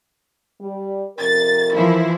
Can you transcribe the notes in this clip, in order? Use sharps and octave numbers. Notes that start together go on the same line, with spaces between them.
G3
F2 C3 A#4 A6
E3 F3 E4